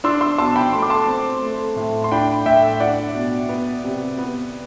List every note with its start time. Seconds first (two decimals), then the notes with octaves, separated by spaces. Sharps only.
0.04 D4 C6 E6
0.21 C6 E6
0.38 B2 A5 C6
0.55 G5 B5
0.73 A3 C6
0.82 D6
0.90 A5 C6
1.07 C4
1.42 A3
1.76 A2
2.04 C6
2.11 D4 G5 B5
2.46 A2 E5 G5
2.80 D4 D5 F#5
3.14 B2
3.49 B3
3.84 C3
4.18 B3